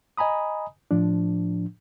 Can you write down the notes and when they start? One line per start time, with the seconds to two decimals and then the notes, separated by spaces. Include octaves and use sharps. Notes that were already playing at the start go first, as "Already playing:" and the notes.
0.17 D#5 G#5 A#5 B5 D#6
0.91 A2 F3 D4